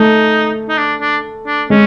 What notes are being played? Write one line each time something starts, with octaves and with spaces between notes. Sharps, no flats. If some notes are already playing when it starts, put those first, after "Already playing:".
Already playing: A3 D#4
D#4
D4
D4
D4
G#3 C#4